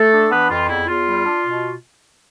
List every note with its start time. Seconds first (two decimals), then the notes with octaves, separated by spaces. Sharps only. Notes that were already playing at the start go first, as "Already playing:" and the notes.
Already playing: A3 A4
0.12 D4
0.31 E3 B3 B4
0.50 F2 F4
0.69 E2 E4
0.88 E2 F4
1.07 G3
1.25 D4
1.45 B2